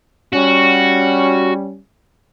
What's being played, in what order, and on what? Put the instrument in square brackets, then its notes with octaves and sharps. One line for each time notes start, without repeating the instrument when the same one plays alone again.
[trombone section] G3 C#4 [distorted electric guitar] F#4